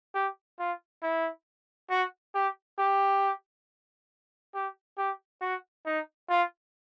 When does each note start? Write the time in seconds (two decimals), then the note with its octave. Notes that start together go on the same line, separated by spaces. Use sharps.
0.14 G4
0.59 F4
1.03 E4
1.90 F#4
2.35 G4
2.78 G4
4.54 G4
4.98 G4
5.41 F#4
5.86 D#4
6.29 F4